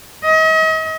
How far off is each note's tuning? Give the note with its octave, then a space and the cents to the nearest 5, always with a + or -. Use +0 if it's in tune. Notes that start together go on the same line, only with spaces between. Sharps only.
D#5 +40